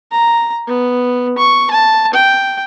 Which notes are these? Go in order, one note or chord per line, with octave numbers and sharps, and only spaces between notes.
A#5
B3
C#6
A5
G5